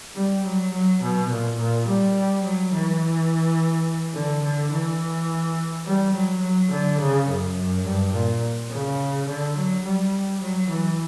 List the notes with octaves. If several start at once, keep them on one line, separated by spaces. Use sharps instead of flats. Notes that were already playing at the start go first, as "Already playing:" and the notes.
G3
F#3
F#3
B2
A#2
A#2
G3
F#3
E3
D3
D3
E3
G3
F#3
F#3
D3
C#3
F#2
F#2
G2
A#2
C#3
D3
F#3
G3
F#3
E3